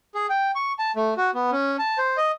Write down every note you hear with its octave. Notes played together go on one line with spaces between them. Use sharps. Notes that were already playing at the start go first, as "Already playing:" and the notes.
G#4
G5
C#6
A5
A3
F#4
B3
C#4
A5
C5
D#5